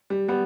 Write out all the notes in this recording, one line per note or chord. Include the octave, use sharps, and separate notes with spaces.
G3
G3 B3